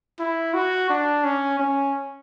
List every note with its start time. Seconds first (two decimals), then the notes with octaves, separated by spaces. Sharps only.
0.19 E4
0.54 F#4
0.90 D4
1.25 C#4
1.60 C#4